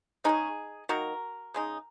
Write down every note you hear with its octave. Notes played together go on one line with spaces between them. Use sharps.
C#3 G#3 C#4 D#4 G#4
D#3 F#3 A#3 F#4 A#4
C#3 G#3 D#4